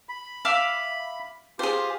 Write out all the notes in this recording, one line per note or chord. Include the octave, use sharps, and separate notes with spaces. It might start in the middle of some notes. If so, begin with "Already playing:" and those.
B5
E5 F5 D6
F4 G4 G#4 C5